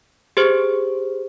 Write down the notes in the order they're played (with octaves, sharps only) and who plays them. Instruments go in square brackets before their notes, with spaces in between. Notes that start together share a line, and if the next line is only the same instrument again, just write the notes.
[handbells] G4 G#4 C5